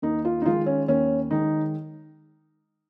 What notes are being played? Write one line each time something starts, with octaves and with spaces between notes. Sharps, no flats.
D#2 D#4
F4
D#4
D#3 G#3 F4
C#4
D#2 C#4
D#3 G#3 D#4